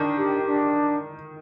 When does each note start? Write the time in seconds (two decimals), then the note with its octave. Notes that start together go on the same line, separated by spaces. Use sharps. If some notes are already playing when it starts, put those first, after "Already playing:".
Already playing: D#3 D4
0.17 G4
0.46 D4